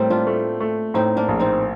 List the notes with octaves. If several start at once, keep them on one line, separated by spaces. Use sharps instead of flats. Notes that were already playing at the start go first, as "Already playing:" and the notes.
Already playing: A2 G3 A#3 C4
D4 F4
A3
A3
A2 C4 D#4
A#3 D4
A#1
C4 D#4